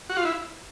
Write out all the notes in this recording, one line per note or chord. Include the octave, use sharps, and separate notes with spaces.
F#4
F4
E4